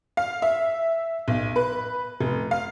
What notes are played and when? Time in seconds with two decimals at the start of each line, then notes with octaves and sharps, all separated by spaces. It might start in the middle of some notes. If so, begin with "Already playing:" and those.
0.17 F5
0.42 E5
1.28 B1
1.56 B4
2.21 F1
2.51 F5